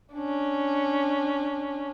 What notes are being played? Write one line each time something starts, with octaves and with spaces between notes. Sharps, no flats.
C#4 D4